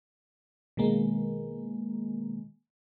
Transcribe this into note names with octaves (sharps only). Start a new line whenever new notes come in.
B2 D#3 G#3 A#3